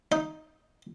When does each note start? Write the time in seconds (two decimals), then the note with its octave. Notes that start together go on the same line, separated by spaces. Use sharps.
0.12 D#4